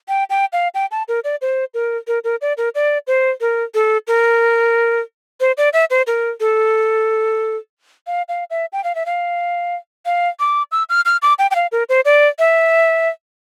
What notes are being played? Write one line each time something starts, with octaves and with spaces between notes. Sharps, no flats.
G5
G5
F5
G5
A5
A#4
D5
C5
A#4
A#4
A#4
D5
A#4
D5
C5
A#4
A4
A#4
C5
D5
E5
C5
A#4
A4
F5
F5
E5
G5
F5
E5
F5
F5
D6
E6
F6
F6
D6
G5
G5
F5
A#4
C5
D5
E5